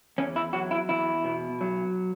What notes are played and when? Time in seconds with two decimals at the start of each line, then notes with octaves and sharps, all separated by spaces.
0.18 E2 C#4
0.36 E4
0.53 F#3 F#4
0.71 E4
0.89 E2 E4
1.24 B2
1.61 F#3